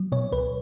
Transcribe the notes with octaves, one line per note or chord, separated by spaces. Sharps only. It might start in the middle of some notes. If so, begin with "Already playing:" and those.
Already playing: F#3
B2 C#5
C#2 B4